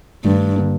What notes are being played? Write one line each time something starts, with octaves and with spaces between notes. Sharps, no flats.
G2 D#3 A3 D4
D3 F3 A#3 D4